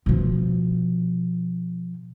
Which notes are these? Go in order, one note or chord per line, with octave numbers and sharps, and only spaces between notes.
B2 F3